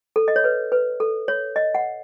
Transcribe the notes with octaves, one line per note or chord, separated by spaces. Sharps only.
A4
D#5
C#5
B4
B4
A4
C#5
D#5
F#5